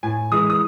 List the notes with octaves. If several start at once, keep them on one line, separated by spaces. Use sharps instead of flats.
A2 G#5
E3 G#3 D#6
D#6